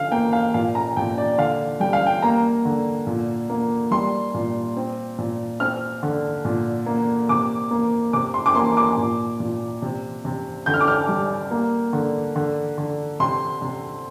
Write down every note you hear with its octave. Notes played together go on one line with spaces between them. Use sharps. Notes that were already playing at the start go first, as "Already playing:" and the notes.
Already playing: D3 F3 F5
A#3 G5
F5
A#2 F5
A#5
A#2 G5
D5
D3 F5
G3 G5
F5
G5
A#3 A#5
D3
A#2
A#3
G3 C6
A#2
C4
A#2
C4 F6
D3
A#2
A#3
C3 D6
A#3
C3 D6
C6
D6
A#3 C6
D6
A#2
A#2
C3
C3
D3 G6
F6
D6
F6
G3
A#3
D3
D3
D3
C3 C6
C3